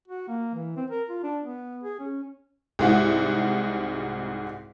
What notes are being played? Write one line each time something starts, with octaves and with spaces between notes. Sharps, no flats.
F#4
A#3
E3
C4
A#4
F4
D4
B3
G#4
C#4
C2 G#2 F#4